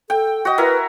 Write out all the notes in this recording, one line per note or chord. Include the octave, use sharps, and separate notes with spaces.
A4 G5
F#4 D#5
E4 A#4 B4